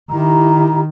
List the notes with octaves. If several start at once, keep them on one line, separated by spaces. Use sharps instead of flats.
D#3 E4 G4 A#5